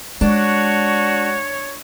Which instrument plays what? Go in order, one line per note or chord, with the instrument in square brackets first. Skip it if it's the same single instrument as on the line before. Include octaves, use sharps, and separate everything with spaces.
[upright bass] G#3 [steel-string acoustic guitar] D4 [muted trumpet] F#4 [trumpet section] C#5